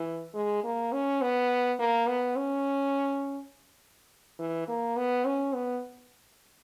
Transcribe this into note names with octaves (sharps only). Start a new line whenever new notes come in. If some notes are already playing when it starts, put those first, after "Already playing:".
Already playing: E3
G#3
A#3
C#4
B3
A#3
B3
C#4
E3
A#3
B3
C#4
B3